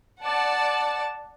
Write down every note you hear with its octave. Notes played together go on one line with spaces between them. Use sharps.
D5 F#5 A5